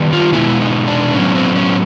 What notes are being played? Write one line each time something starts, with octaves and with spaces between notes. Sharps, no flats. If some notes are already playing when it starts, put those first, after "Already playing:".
Already playing: D#3 G3 B3
F4
B2 G#3 B3 E4
D#4
D4
A2 F#3 B3 C#4
C4
C#4